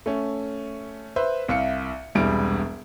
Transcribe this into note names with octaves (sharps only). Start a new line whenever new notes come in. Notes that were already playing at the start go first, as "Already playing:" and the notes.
A3 C#4
B4 C5 E5
C2 E5 F5 C#7
E1 C2 G3 G#3 D7